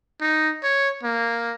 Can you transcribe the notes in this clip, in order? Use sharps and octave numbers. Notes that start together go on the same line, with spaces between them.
D#4
C#5
A#3